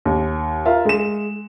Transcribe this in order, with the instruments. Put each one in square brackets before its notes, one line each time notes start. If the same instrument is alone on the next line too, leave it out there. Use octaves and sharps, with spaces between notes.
[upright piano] D#2
F4 A#4 E5
G#3 E7